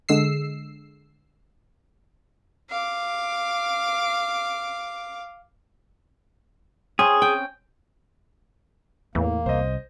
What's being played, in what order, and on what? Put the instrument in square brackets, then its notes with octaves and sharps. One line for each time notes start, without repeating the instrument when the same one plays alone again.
[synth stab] D3 G#3 E6 C7
[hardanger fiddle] F5 D6
[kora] C4 C#4 [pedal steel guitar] G#4
[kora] G5
[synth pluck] E2 [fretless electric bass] A2 [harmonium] A#3
[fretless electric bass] C2 [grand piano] C5 D#5